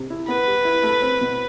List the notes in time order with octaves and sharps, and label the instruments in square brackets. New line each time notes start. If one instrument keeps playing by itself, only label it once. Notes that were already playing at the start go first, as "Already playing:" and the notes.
Already playing: [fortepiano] C3
E4
[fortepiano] B3 [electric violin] B4
[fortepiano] G3
E4
A3
C4
B2